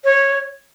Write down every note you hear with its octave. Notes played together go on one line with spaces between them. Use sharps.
C#5